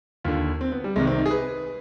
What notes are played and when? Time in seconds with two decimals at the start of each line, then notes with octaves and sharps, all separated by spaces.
0.24 D#2 D3 F4
0.61 C4
0.72 B3
0.84 G3
0.96 C2 C3 D#3 G#3
1.07 C4
1.18 D#4
1.26 G#4
1.31 B4